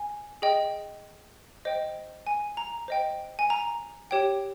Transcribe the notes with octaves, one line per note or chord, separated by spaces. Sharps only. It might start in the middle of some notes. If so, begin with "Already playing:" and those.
Already playing: G#5
G#4 D#5 G5
C5 D#5 G5
G#5
A#5
C5 D#5 G5
G#5
A#5
G4 C#5 G5